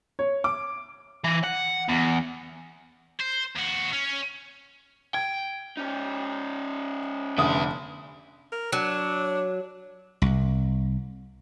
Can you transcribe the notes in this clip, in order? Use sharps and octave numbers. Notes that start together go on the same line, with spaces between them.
C#5
D6
E3
F#5
E2
C5
D#2 F#4
C#4
G5 G#6
C#4 D#4
F1 D3 B3 E4 D#6
A#4
F#3 D4
C2